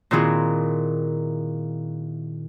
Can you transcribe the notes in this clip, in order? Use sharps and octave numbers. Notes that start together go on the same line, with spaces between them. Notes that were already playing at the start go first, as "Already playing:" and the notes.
A#2 D#3 C4 E4 F#4 G#4